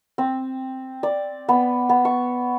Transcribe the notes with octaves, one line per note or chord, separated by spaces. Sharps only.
C4
D5
B3
B3
C#6